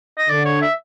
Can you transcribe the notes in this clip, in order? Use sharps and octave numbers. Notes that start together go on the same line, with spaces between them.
D#5
D3 D5
C#5
E5